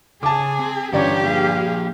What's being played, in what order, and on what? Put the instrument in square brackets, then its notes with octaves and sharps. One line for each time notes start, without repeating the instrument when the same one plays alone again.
[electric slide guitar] C#3 [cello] G#4 [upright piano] A5 D6
[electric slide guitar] C4
[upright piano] G1 D5 [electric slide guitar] E3 F4 A#5 [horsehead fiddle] C#4 C#5 [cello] G4
[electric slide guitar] F3 A#3 [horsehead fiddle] G#4 F5